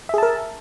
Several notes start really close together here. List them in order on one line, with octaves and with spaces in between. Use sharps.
E5 G#4 A5 A#4